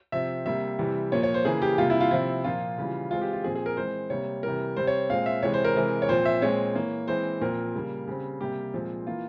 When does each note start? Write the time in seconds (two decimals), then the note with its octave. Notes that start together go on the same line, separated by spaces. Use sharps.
0.12 C3 F3 C4 E5
0.46 C3 G3 A#3 E5
0.79 C3 E3 G3
1.12 A#2 F3 A#3 C#5
1.23 C#5
1.34 C5
1.45 C#3 E3 A#3 G#4
1.62 G4
1.78 C3 G3 A#3 F4
1.90 E4
2.01 F4
2.11 C3 F3 C4 E4
2.44 A#2 F3 A#3 F4
2.78 C#3 E3 G3
3.11 E3 G#3 C4 F4
3.21 G4
3.33 F4
3.44 A#2 F3 C4 G#4
3.55 G#4
3.66 A#4
3.77 E3 G#3 C4 C5
4.10 C3 G3 A#3 C#5
4.43 C3 E3 G3 A#4
4.76 C3 G3 C4 C5
4.87 C#5
5.10 A#2 G#3 C4 F5
5.26 E5
5.42 C3 E3 G#3 C#5
5.54 C5
5.65 A#4
5.75 C3 E3 G#3 C4
6.02 C#5
6.09 A#2 F3 C4 C5
6.25 E5
6.42 A#2 G#3 C4 C#5
6.75 E3 A#3
7.08 E3 G#3 C4 C5
7.41 A#2 F3 C4 A#4
7.75 C#3 G3 A#3
8.07 C#3 G3 C4
8.40 C3 G3 A#3 G4
8.74 A#2 F3 G#3 C4
9.07 E3 A#3 F4